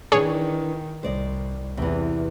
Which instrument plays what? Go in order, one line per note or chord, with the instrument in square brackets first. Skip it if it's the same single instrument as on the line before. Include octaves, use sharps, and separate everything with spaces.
[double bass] D#3 [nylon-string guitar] E3 D4 D#4 [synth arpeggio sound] G#4 C#5
[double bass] C2 [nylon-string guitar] C5 D5 D#5
[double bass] E2 [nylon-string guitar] C3 E3